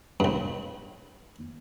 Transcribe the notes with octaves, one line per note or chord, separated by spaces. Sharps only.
C2 G2